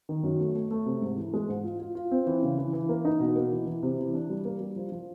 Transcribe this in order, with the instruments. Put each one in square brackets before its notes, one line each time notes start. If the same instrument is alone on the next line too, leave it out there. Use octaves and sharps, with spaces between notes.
[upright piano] D#3
F#2
A3
A3
A3
C3
G#2
E3
G#3
G#2
F4
F4
F4
C4
E3
C#3
E3
E3
A#3
D#4
B2
A#3
E3
E3
C3
E3
D4
G3
A#3
G3
F3
F3